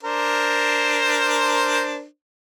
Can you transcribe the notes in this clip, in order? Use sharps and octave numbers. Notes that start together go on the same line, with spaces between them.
D4 A#4 C5